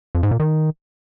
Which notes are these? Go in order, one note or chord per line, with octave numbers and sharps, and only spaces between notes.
F2
G#2
A#2
D#3